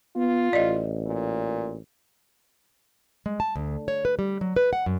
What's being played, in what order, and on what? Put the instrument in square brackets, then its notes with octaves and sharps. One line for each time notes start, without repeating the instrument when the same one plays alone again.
[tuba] B3 [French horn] F4
[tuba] A1 [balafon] D5 D#5
[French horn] A#2
[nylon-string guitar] G#3
A5
D2
C#5
B4
G3
F#3
B4
F#5
F#2